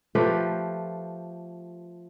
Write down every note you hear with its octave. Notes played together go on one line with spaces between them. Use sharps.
F3 A3 G4 B4